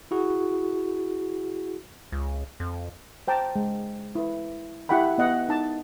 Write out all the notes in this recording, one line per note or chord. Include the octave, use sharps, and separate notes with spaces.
E4 F#4 G#4
C#2
F2
C5 G5 A5 A#5
G#3
E4 B4
E4 G4 F#5 G5 B5
B3 D#5 F#5
D#4 A5